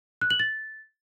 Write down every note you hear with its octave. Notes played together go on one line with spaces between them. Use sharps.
F#6
F#7
A6